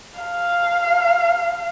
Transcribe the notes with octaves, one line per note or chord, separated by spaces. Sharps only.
F5